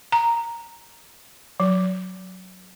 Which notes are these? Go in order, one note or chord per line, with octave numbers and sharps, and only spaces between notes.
A#5
F#3